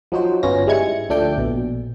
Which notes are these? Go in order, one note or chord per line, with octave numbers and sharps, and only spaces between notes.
F3 F#3 D#4 F#4 C5
G1 B3 C#4 F4 A#6
G#2 G3 G#3 E4 G#6 C#7
D2 F3 A3 D4 A4 G5
A#1 B2